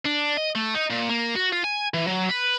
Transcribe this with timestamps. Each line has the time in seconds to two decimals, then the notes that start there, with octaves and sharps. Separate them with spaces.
0.06 D4
0.37 D#5
0.55 A3
0.74 D#4
0.90 A#2
1.09 A#3
1.35 F#4
1.52 F4
1.64 G#5
1.94 E3
2.07 F#3
2.29 B4